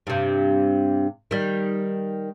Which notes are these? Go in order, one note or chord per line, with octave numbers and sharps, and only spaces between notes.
G2 C3
D#3 G3